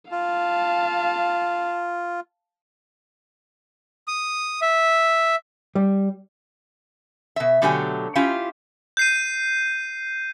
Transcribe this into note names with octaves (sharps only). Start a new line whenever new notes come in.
F4 F5 A5
D#6
E5
G3
B2 E5
B2 D3 F#3 A3 G4 G#5
C#4 E4 F4 G4 F5
G6 C7 D#7